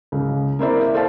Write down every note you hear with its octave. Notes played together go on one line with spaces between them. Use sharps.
C#2
A#3 C4 E4 C5 D5 E5
A4 C5 D5 F5 A5